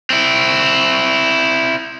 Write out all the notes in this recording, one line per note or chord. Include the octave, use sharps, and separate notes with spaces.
C4 E4